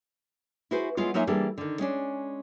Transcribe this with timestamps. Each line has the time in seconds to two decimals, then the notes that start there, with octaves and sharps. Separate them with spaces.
0.71 E4 F#4 G#4 B4 C5
0.97 F#3 G#3 B3 E4 F4
1.14 F#3 A#3 D#4 F4 E5 G#5
1.27 E3 G3 A#3 D4 G#4 A4
1.58 D3 D#3
1.79 G#3 C#4 D4